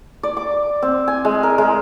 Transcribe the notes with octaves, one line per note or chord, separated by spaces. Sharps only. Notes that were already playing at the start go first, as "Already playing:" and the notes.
D5
D6
C4
G#5
G#3
A#4
G#3